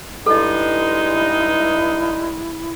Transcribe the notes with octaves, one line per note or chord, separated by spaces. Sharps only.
G2 G#3 D#4 E4 A4 D#5